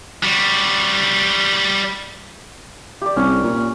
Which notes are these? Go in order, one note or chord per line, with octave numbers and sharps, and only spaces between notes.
G3 F#4
G4 D5
C2 C#4
A#2